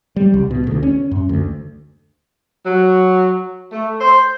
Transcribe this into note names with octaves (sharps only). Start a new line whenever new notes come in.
G3
C2
B2
D2
C#4
F#2
D2
F#3
A3
C5